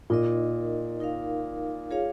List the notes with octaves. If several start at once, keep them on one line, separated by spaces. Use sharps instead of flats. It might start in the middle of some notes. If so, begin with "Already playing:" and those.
A#2 D#4 A#4 D#5
D#4 A#4 F5
F4 G#4 C#5 F5